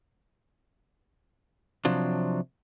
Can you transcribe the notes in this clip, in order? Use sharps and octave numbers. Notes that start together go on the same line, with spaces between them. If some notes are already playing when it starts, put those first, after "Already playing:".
C3 F3 F#3 D4